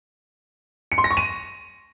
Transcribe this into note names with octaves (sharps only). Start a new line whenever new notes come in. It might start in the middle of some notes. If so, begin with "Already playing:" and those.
C#7
C6
A#6
C#6
D#7